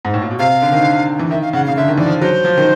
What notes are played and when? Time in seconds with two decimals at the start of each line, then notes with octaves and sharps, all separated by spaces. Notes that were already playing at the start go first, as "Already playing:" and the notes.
0.05 G#2
0.14 A2
0.22 A#2
0.31 B2
0.39 C3 F5
0.62 D3
0.72 D#3
0.83 D3
1.19 E3
1.31 D#3 E5
1.42 F5
1.53 C#3 F#5
1.65 F5
1.69 C#3
1.76 D3 E5
1.88 D#3
1.97 E3 D5
2.06 F3
2.21 F#3 C5
2.45 F3
2.58 D#3